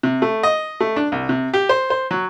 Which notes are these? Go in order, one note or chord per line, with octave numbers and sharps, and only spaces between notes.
C3
A3
D#5
A3
D4
C2
C3
G4
C5
C5
F#3